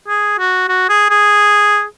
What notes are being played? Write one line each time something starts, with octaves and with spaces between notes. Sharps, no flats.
G#4
F#4
F#4
G#4
G#4